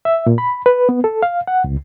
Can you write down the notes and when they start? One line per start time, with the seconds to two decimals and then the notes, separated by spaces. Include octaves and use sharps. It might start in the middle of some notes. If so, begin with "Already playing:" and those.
0.05 E5
0.26 A#2
0.38 B5
0.66 B4
0.89 B3
1.04 A4
1.22 F5
1.47 F#5
1.64 C#2